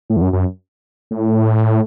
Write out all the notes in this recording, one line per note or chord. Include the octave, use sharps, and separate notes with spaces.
A2
E2
F#2
F#2
A2